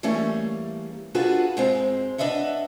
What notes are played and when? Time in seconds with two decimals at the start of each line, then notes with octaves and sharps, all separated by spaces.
0.03 E3 G3 A3 A#3 C#4 G#4
1.14 D4 F4 F#4 G#4 A4 B4
1.57 G#2 G#3 C4
2.18 D4 B4 D#5 E5 F#5